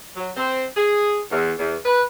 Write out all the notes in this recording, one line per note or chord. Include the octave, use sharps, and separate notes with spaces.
F#3
C4
G#4
E2
E2
B4